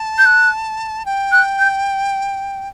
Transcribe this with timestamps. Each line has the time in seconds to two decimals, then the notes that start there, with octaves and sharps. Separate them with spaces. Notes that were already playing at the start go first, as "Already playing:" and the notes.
Already playing: A5
0.18 G6
0.26 F#6
1.06 G5
1.32 F#6
1.59 G6